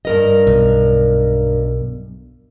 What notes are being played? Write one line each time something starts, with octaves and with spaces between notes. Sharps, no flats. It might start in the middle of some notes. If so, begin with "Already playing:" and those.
G2 A#4 D#5
B1